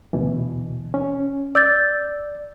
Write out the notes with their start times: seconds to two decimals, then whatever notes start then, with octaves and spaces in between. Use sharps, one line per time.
0.13 D2 B2 E3
0.94 C#4
1.55 D5 E6 G6 A6